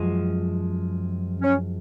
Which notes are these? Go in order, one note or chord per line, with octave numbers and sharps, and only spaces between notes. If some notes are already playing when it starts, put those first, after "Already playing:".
Already playing: F#2 F3 G#3
C#4